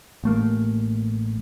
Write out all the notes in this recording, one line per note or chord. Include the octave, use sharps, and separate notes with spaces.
A1 A3 A#3